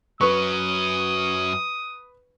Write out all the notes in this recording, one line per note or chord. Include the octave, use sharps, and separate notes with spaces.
F#2 F#3 B4 C#6 D#6